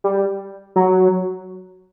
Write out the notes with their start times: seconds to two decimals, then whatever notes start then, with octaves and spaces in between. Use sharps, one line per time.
0.04 G3
0.76 F#3